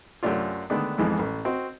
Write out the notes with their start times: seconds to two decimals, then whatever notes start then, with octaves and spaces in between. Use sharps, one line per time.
0.23 F#2 C3 A3 C#4 D4 F4
0.70 D3 D#3 G#3 A3 B3 D4
0.98 F2 G#2 E3 G#3 B3
1.19 A1
1.45 C4 F#4 D#5